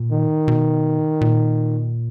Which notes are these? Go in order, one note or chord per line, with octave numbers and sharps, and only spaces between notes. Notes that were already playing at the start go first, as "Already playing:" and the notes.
Already playing: A#2
D#3
B2
A#2